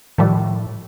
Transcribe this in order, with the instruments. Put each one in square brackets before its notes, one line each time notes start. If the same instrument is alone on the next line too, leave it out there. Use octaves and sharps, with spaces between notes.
[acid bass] A2 [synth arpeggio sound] D#3 F3 G3